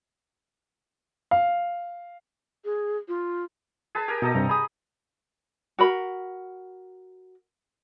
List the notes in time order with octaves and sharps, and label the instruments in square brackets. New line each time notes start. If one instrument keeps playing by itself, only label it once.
[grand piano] F5
[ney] G#4
F4
[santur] G#4 B4 A5
G4 A#4 G#5
[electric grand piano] B2 [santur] D#4 A4 D#5
[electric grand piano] G2 C3 [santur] A#5
[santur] G#4 [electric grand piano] B5 D#6
[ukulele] F#4 A#4 B5